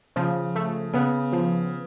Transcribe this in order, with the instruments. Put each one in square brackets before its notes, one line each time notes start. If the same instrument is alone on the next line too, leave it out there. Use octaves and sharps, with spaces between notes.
[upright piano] C#3 [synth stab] F3
[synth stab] A3
[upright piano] C#3 [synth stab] B3
[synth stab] F3